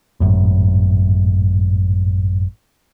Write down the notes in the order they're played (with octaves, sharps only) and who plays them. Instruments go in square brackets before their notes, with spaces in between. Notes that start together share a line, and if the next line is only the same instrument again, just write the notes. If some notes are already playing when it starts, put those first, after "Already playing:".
[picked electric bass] G#1 F#2 A2